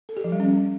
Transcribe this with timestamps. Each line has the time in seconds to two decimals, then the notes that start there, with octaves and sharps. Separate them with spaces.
0.09 A4
0.17 G4
0.24 F3
0.32 G3
0.40 C#4